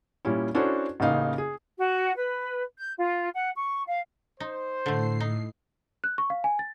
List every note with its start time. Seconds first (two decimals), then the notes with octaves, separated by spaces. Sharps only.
0.25 A#2 G3 C#4 E4
0.55 C#4 D4 E4 F#4 A4 C5
1.00 A1 C#3 A#3 D#4 F5
1.38 G#4
1.78 F#4
2.15 B4
2.78 G6
2.98 F4
3.34 F#5
3.56 C#6
3.86 F5
4.40 D#4 C5
4.86 A2 D3 A3 C7
5.20 D#4
6.04 F#6
6.18 C#6
6.30 F5
6.44 G#5
6.59 A6